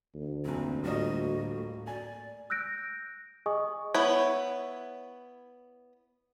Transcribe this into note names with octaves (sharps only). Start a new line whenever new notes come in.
D2
F#1 E2 A#2 C4
A2 G3 A#3 F4 F#4 D#5
D5 G#5
E6 F#6 G6 A#6 D7
G#4 D#5 G#5 C#6 D#6
B3 E4 C#5